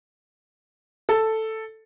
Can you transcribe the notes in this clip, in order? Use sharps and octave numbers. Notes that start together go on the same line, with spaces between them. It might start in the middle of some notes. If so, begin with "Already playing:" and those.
A4